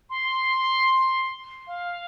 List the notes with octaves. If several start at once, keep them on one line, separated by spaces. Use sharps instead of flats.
C6
F5